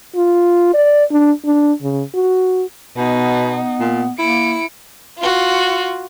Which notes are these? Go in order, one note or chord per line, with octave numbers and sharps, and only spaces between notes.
F4
D5
D4
D4
C#3
F#4
B2 B3 D#4
A#2
A#3 E4 C#7 D7
F4 F#4